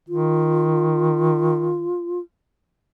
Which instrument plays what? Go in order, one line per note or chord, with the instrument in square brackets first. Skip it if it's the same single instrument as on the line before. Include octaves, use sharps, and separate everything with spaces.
[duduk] D#3 [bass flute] F4